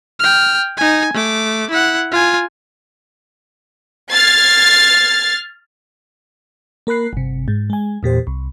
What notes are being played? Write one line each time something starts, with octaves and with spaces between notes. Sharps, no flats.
G5 F6
D#4 G#5
A3 D6
E4 F#5
F4 G#5
F6 G#6 A6 C7
A#3 A#4 B5 F#6 C7
G1 C3
G#2
G#3 G#5
E2 A#2 G4 C5
C2